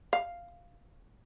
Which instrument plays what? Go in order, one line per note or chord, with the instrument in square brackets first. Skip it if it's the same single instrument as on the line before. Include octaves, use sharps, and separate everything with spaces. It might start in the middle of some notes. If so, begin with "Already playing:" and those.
[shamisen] F5